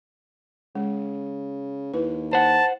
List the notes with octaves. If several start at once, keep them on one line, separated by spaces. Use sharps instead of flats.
C#3 G#3
D#2 E4 B4
C5 F#5 A5